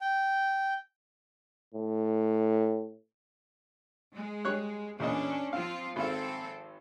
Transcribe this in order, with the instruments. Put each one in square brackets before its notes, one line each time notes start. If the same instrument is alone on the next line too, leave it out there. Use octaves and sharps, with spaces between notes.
[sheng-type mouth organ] G5
[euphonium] A2
[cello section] G#3
[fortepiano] G3 C#5 F#6
[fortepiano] E2 A#2 D#5 [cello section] C#4 D4
[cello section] F3 C4 F4 [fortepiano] F5
[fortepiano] G#1 F5 [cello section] C4 A4